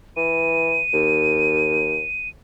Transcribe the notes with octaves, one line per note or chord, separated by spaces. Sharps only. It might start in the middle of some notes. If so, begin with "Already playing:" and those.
E3 D#7
D#2